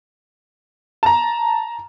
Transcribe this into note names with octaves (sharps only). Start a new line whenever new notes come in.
A5 A#5